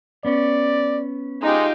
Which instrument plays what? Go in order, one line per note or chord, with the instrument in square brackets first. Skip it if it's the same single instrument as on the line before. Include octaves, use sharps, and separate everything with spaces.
[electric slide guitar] B3 C#4 [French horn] D5
[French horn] G#3 [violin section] D#4 F4 G4